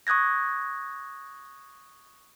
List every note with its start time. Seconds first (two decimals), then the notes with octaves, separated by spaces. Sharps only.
0.07 C#6 D#6 F#6 G#6 A#6